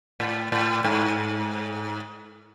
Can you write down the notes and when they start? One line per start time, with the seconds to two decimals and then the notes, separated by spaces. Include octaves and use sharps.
0.20 A2
0.52 A2
0.84 G#2